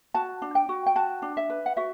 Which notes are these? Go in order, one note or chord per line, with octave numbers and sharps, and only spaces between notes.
F#4 A5
D4
G5
F#4
G5
F#4 A5
D4
E5
B4
F#5
F#4 E5